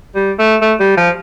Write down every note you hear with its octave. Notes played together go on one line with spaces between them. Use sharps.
G3
A3
A3
G3
F3